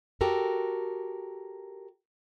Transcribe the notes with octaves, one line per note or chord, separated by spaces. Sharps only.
F#4 G4 A4 A#4